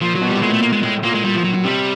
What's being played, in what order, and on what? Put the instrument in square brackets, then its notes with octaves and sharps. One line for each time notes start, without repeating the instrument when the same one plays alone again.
[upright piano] A#2 [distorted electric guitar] F3
[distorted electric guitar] F#3
[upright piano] B2
[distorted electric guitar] G3
[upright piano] A2
[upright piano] A#2 [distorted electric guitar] G#3
[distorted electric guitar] A3
A#3
G#3
[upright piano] A2 [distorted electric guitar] G#3
[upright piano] A#2 [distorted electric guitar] A#3
[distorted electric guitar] G#3
[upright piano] A#2 [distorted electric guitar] G3
[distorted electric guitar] F3
F#3
F#3
[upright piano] C3 [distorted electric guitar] G3